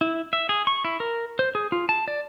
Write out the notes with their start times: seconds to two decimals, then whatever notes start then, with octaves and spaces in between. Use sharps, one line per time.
0.01 E4
0.33 E5
0.49 G#4
0.67 C#6
0.85 E4
1.00 A#4
1.39 C5
1.55 G#4
1.72 F4
1.89 A5
2.08 D5